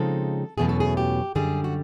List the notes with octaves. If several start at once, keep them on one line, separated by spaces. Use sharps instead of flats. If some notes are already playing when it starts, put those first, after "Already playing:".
Already playing: C#3 F3 G#3 C4 D#4 A4
E2 B2 F#3 A3 C#4 G#4
A4
G#4
G4
F#2 D3 G3 G#4
F#4